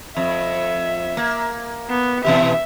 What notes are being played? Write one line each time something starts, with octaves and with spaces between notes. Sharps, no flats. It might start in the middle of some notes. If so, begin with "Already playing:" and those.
F2 E5
A#3
B3
B2 E3 G4 E5